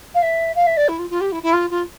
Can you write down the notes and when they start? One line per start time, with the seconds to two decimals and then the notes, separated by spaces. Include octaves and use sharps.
0.14 F5
0.22 E5
0.55 F5
0.66 E5
0.77 D5
0.88 E4
0.98 F4
1.10 F4
1.20 G4
1.32 E4
1.42 E4
1.53 F4
1.70 F4